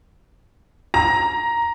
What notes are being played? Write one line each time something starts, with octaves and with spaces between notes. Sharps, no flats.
A#5